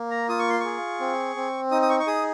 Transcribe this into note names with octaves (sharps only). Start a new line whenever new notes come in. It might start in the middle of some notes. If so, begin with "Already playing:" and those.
Already playing: A#3
A#5
F4 D#6
C#6
C6
G#4 C#6
C4
C4
D#4 D#6
D#6
C#6
C#6
G#4 D#6